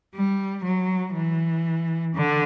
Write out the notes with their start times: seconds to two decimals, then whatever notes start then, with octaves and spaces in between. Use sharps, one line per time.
0.15 G3
0.64 F#3
1.14 E3
2.14 D3